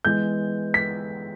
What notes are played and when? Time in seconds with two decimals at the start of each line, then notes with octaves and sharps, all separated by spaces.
0.05 E3 G#3 B3 G6
0.74 B6